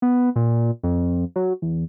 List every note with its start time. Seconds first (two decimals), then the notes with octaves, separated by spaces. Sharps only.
0.02 B3
0.36 A#2
0.83 F2
1.36 F#3
1.62 E2